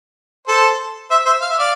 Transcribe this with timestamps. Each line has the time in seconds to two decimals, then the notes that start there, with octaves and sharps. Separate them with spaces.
0.48 A4 C5
1.10 C5 E5
1.26 C5 E5
1.41 F5
1.50 E5
1.59 D5 F5